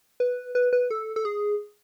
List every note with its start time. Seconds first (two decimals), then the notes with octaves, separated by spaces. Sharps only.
0.20 B4
0.55 B4
0.73 B4
0.90 A4
1.16 A4
1.25 G#4